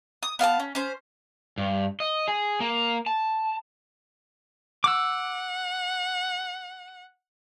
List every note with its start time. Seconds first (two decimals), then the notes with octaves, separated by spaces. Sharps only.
0.23 D#6
0.39 B3 F5 G5 A5
0.60 C#4
0.75 C#4 C5
1.58 G2
2.00 D#5
2.28 G#4
2.60 A#3
3.06 A5
4.84 F#5 D6 E6